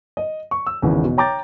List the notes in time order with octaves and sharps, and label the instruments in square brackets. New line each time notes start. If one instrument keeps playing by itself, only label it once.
[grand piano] D#5
C#6
E6
G#1 E2 C#3 E3
B2
C#5 G5 A#5 D6 G6 A6